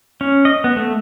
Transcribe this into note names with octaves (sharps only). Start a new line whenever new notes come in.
C#4
D#5
B3
A3